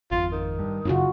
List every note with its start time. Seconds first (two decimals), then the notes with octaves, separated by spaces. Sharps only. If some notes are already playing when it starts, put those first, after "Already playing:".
0.11 G#1 F2 F4
0.32 D#3
0.59 G2
0.85 F#2 C#3 D#4 F4 F#4